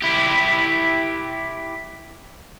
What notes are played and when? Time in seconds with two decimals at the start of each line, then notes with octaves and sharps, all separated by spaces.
0.02 E4 G4